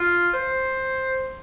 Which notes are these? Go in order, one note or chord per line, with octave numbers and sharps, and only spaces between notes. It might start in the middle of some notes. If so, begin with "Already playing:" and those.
Already playing: F4
C5